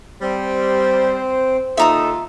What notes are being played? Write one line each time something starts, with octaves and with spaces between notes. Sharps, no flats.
G3 C4 C5
D#2 D#4 F4 A4 E5 A#5 D#6